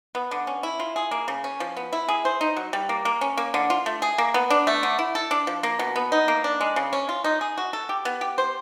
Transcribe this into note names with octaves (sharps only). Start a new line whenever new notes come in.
B3
D3
C#4
E4
F4
G#4
A#3
C#3
C#4
F3
B3
E4
G#4
C5
D#4
F#3
G3
A#3
A#3
C#4
A#3
D3
F4
A3
G#4
A#3
B3
D4
A3
D3
E4
A4
D4
F3
A#3
B2
B3
D#4
A#3
D4
G#3
C#3
C#4
F4
D#4
G#4
F#4
A4
G4
B3
G4
C5